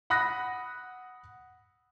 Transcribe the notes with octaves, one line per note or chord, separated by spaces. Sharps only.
F#5 B5 D#6 F#6 A#6